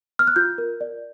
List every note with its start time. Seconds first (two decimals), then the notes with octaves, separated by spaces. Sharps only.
0.19 F6
0.27 F#6
0.36 F4 G6
0.58 A#4
0.81 D5